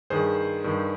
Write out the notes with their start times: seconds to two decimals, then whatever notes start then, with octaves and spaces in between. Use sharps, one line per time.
0.10 G2 D#3 G#4 C5
0.64 G2 D#3